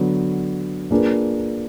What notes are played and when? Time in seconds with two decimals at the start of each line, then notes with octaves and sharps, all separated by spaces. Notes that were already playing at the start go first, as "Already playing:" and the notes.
Already playing: D3 F#3 B3
0.91 A#3 D4 F4 G#4 B4